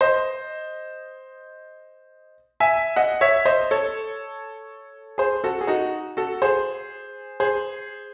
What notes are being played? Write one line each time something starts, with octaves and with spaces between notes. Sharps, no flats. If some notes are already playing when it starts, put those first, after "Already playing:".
C5 D#5
E5 G#5
D#5 F#5
C#5 E5
C5 D#5
A4 C#5
G#4 C5
F#4 A4
G#4
D#4 F#4
F#4 A4
G#4 C5
G#4 C5